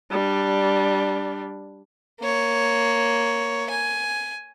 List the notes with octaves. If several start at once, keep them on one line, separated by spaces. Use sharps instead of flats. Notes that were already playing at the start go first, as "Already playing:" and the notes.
G3 D4
A#3 C#5
G#5